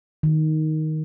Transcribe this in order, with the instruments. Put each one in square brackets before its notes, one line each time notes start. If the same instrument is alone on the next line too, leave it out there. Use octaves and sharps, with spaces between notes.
[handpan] D#3